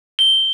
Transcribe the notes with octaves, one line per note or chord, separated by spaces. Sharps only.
G7